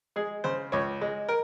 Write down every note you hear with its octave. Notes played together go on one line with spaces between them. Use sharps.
G#3 G#4
C#3 C5
C#2 C#5
G#3
A#4